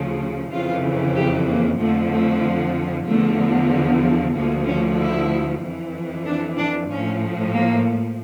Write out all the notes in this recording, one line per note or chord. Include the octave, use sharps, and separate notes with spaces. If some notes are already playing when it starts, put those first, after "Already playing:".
Already playing: D2 C#3 F3
F2 C#3 E3 F4
G4
A#3
F2 D3 F3 A3
A3
E2 D3 F3 A3
D2 D3 F3 A#3
C#4
E4
F2 E3
D4
D4
A2 F3 C#4
A#3